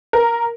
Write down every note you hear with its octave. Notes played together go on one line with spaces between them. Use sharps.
A#4